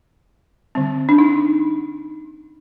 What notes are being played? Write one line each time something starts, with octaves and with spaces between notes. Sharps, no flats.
D3 G3 C4
D4
D#4